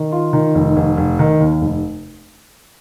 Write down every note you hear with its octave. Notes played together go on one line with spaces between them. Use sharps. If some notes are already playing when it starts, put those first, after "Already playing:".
Already playing: D#3
F4
D#3
F1
F1
F1
D#3
D#2
F1